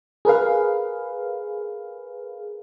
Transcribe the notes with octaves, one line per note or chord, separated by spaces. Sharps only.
G#4 A#4 B4 F5